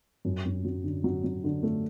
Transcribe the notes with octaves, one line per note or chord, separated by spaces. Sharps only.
F#2
F#2
F#3
D3
F#3
F#3
D3
A3